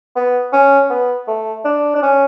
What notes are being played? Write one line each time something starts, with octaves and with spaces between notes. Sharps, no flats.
B3
C#4
B3
A3
D4
D4
C#4